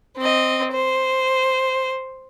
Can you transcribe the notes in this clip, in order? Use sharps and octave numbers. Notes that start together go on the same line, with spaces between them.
C4 D#5
C5